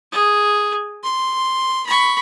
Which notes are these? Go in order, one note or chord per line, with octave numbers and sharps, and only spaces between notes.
G#4
C6
B5 C#6